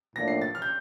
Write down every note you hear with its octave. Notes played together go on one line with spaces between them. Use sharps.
A2 F3 A#3 D4 A#6
C7
A6
F6
G6